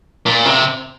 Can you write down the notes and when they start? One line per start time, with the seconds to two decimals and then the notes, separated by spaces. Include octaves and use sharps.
0.26 A#2
0.45 C3